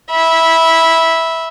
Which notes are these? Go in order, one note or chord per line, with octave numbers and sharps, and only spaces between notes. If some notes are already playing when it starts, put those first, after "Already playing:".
E5 B5